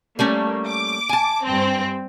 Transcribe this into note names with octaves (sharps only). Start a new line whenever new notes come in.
G3 A3 A#3 C#4
D6
G#5 A5
G2 C4